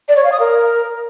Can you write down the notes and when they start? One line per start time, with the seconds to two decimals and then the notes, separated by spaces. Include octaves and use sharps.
0.09 D5
0.16 C#5
0.24 F5
0.32 D#6
0.40 A#4